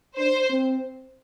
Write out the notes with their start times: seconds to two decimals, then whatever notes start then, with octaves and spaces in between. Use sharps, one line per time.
0.17 D4 C5
0.50 C4